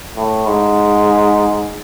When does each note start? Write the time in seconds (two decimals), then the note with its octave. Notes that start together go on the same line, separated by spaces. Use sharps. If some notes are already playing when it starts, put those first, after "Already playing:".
0.16 A2
0.47 G#2